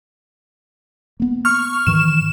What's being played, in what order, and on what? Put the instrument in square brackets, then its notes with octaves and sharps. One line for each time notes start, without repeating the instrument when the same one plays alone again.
[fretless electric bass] A#3 B3
[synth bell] C#6 F6
[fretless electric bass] G#2 D#3 E3 [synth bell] E7